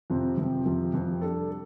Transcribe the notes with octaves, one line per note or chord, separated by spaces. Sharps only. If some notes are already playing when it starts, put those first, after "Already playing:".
F2 C3 F3 C4
F2 C3 F3 C4
F2 C3 F3 C4
F2 C3 F3 C4
G3 D4 A4
A4